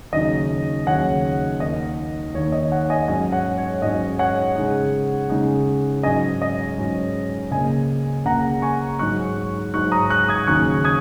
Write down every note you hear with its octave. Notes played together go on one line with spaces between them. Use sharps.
D#2 C#3 F#3 D#4 D#5
D#2 C#3 F#3 D#4 C#5 F#5
D#2 D#3 A#3 D#4 D#5
D#2 D#3 A#3 D#4 C#5
D#5
C#5 F#5
D#5 G#5
G#2 F#3 C#4 D#5 G#5
C#5 F#5
C#5
G#2 F#3 C#4 D#5
C#5 F#5
C#3 G#3 D#4
C#3 G#3 D#4
G#2 F#3 C#4 D#5 G#5
D#5
G#2 F#3 C#4
C#2 C#3 A#3 C#4 D#5 G#5
C#2 C#3 A#3 C#4 F#5 A#5
G#5 C#6
G#2 F#3 D#4 C#6 F#6
G#2 F#3 D#4 C#6 F#6
A#5 D#6
C#6 F#6
D#6 G#6
D#2 C#3 F#3 C#6 F#6
D#6 G#6